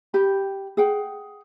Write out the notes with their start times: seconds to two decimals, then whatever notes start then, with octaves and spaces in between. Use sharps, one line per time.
0.14 G4 G5 B5
0.77 G#4 F#5 G5